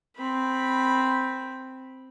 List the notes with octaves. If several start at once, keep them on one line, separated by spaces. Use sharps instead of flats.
C4 B5